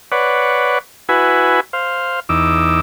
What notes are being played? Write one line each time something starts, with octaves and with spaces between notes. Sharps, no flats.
B4 C#5 D5 F#5
E4 F#4 B4 G#5
C5 F5
E2 D#4 D6 E6